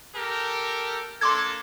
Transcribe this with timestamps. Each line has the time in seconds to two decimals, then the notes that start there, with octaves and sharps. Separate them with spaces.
0.15 G4 A4 A#4
1.21 A#3 D4 A4 C6 D6 G#6